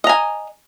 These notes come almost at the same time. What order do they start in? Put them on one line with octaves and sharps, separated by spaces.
D#5 A#5 G#5